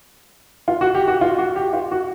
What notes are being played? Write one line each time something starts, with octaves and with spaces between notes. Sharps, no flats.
F4
F#4
G4
F#4
F4
F#4
G4
F4
F#4